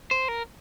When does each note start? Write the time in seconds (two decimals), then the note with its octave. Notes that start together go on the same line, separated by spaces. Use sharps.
0.11 C5
0.28 A#4